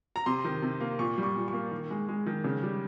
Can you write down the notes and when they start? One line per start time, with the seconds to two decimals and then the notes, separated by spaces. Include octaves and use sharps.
0.16 A#5
0.26 C3 C6
0.45 D#3
0.62 C3
0.80 A#3
0.99 A#2 C#6
1.18 G3
1.23 C#6
1.36 A#2
1.48 A#3 C#6
1.71 D#3
1.90 G#3
2.08 G#3
2.26 D#3
2.44 C#3
2.63 G3